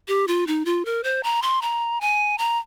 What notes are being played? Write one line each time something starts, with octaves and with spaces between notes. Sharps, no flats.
G4
F4
D#4
F4
A#4
C5
A#5
C6
A#5
G#5
A#5